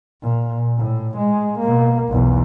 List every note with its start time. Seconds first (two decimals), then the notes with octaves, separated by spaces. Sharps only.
0.22 A#2
0.77 A2
1.17 G#3
1.59 B2 A#3
2.08 B1 E2